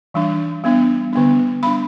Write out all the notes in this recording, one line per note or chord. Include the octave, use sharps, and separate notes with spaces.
E3 G3 D4
G3 B3 D4
D3 B3 D4
G3 B3 D4 B5